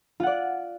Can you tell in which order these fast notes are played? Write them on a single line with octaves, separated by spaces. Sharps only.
F4 F#5 D5